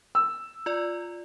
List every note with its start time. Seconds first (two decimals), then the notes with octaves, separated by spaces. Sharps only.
0.15 E6
0.66 F4 D5